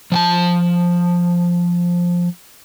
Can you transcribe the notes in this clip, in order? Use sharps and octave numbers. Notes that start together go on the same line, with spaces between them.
F3 G5 A5